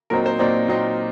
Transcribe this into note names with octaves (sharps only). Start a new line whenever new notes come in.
A#2 F#3 C4 D#4 A#4
C5
A#2 F#3 C4 D#4 D5
A#2 F#3 C4 D#4